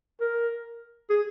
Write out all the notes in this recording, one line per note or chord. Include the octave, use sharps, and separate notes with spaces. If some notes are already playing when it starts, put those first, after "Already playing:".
A#4
G#4